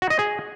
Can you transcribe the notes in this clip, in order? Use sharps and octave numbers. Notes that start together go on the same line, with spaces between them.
F#4
D#5
G#4